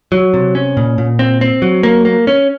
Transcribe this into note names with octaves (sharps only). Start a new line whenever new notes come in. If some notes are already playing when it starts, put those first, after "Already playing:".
F#3
C3
C#4
A#2
A#2
C4
C4
F#3
A#3
A#3
C#4